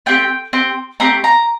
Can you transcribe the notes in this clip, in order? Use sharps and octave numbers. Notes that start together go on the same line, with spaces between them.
A3 C4 G4 G5
C4 G4
A3 C4 G4 A#5
A#5